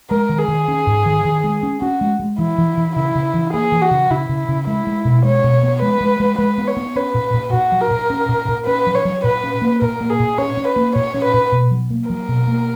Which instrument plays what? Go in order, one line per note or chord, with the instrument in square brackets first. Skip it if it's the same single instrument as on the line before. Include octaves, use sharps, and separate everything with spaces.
[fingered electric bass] G#3 [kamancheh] A#4
[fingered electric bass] D#3
[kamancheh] G#4
[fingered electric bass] D#3
C#4
G#2
D#3
D#3
G#3
C#4
[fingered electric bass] C#4 [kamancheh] F#4
[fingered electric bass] G#3
G#3
[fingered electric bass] E3 [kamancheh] E4
[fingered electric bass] E3
E3
[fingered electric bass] C#3 [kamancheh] E4
[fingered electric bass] C#3
E3
[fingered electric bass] A#3 [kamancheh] G#4
[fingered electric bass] E3
[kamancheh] F#4
[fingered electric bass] C#3
[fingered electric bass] C#3 [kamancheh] E4
[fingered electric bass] C#3
C#3
[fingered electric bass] G#3 [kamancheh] E4
[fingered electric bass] G#3
B2
[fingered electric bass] G#3 [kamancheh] C#5
[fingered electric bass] B2
B3
[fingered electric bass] G#3 [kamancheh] B4
[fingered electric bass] G#3
G#3
[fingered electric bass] G#3 [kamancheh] B4
[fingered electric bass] B3
[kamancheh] C#5
[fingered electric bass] B3
[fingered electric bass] C#4 [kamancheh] B4
[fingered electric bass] A#2
A#2
[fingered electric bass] A#2 [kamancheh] F#4
[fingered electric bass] F#3
[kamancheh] A#4
[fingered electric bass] A#2
C#4
A#2
A#2
[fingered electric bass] C#4 [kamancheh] B4
[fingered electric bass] F#3
[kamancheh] C#5
[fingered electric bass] F#3
[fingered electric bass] A#2 [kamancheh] B4
[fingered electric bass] C#4
A#3
[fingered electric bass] A#2 [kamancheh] A#4
[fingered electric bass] A#3
[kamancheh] G#4
[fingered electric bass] A#2
[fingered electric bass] C#4 [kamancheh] C#5
[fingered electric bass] C#4
[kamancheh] B4
[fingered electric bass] A#3
[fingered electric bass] A#2 [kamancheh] C#5
[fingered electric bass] C#4
[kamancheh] B4
[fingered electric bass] A#2
B2
F#3
A#3
[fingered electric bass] F#3 [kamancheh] A#4
[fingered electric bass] B2
A#3